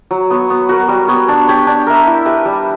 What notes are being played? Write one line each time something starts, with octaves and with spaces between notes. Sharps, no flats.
F#3
B3 F#4 C#5
B3
F#4 A#4
G3
B3 F#4 C#5
D4
G4 C#5
D4
A#4 E5
E4
G4 B4 E5
G3